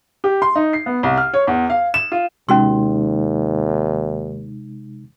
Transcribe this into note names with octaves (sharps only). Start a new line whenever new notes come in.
G4
C6
D#4
C7
B3
C2
F6
C#5
E2
F5
E7
F4
D#2 C3 G#3 C#4 D#4 F#4 C6